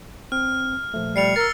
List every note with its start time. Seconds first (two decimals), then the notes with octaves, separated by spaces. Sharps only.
0.32 C4 F6
0.94 A#2 F3 A3
1.16 G3 C7 C#7 F7
1.36 A#4 E6 A6